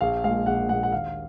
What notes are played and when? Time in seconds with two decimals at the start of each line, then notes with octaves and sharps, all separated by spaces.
0.01 A#1 F5
0.24 A#2 G#3 F5
0.46 A#1 F#5
0.69 A#2 G#3 F#5
0.83 F#5
0.92 D#2 F5